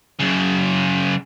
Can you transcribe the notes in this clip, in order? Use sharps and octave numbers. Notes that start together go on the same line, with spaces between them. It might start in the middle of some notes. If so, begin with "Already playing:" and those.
F#2 C#3